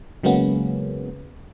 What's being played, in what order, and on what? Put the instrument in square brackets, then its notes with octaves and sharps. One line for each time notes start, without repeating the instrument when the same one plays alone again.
[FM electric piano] C#3 F#3 G#3 A#3 B3 C#4